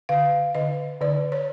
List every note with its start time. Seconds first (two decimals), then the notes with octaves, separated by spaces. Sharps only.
0.09 D3 F5
0.55 D3 D#5
1.01 D3 D5
1.32 C#5